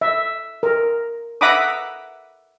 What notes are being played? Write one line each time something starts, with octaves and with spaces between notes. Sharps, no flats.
E5
A#4
E5 F#5 A#5 B5 D6 D#6